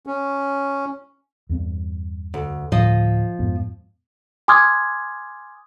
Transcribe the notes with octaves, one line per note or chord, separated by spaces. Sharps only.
C#4
E2 G2 C4
D2
D2 A2 F3 D#5
F2 G#2 B3
G#5 C6 D6 D#6 F6 G#6